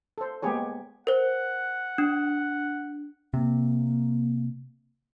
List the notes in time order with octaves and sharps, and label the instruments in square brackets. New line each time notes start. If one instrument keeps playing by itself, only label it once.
[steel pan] A4 C5
G#3 A#3 B3 G4 G#4 C#5
[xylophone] A#4 C5 [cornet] F#5
[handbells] D4
[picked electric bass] C3 [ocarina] A#3